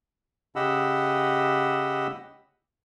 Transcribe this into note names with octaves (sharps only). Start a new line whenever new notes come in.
C#3 G4 D#5 F#5 B5 E6